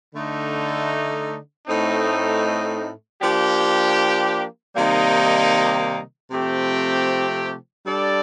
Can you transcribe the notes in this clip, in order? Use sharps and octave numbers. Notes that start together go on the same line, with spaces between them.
D3 A3 D#4
A2 A3 C4 D#4
F3 A#3 D4 G4
C3 D#3 G3 A#3 D#4
C3 F3 A3 C4 G4
G3 D4 A4 D5